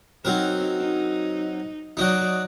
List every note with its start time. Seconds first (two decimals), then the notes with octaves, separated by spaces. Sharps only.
0.25 F#3 C4 D#4 A#4
0.80 D#4
1.97 F#3 D#4 D5 D#5 F#5